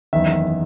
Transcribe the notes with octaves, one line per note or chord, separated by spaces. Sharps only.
F#1 E2 D#3 E5